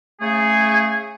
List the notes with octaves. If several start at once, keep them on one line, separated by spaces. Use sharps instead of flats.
C#3 A3 G#4